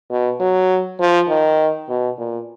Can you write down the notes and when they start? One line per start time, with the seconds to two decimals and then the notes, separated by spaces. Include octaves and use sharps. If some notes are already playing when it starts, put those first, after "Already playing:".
0.10 B2
0.40 F#3
0.99 F3
1.28 D#3
1.89 B2
2.18 A#2